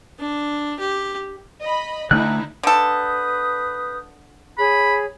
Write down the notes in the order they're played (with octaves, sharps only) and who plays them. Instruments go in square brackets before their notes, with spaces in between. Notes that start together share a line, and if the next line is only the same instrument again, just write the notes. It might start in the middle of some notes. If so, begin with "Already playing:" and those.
[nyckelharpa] D4
G4
[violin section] D#5 B5
[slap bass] D3 A3 [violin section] D#4 E4 [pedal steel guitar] F#6
[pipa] D3 A4 [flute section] B4 D#6 G6
[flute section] G#4 C#5 [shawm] B5